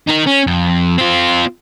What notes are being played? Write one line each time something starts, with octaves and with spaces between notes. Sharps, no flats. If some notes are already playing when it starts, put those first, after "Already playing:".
D#4 A#4
C#4
F2
C4 F4